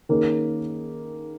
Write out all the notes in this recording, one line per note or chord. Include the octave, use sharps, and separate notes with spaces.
D#3 A#3 C#4 G#4